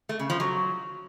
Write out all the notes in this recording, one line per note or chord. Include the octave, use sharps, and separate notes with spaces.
A3
C#3
F3
F#3